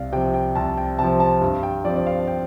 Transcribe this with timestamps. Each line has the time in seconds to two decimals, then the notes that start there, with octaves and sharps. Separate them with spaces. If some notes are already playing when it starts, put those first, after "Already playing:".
Already playing: C2 D5 F5
0.12 C3 F3 G5
0.34 G5
0.55 C2 A5
0.78 G5
0.99 C3 F3 A5
1.20 A5
1.41 G2
1.63 G5
1.85 F3 C4 D5
1.96 D5
2.07 F5
2.27 G5